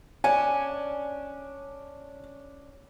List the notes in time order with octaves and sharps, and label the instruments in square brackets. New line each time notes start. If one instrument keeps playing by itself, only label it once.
[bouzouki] C#4 D4 [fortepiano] G#5